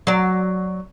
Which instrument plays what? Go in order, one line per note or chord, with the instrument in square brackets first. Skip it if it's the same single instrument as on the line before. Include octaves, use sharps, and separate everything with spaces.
[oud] F#3 D5